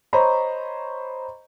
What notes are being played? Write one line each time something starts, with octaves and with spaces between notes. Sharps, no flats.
C5 C#5 D#5 A#5 B5 C#6